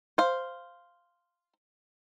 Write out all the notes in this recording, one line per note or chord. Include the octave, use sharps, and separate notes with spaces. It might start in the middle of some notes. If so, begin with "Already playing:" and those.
C5 F5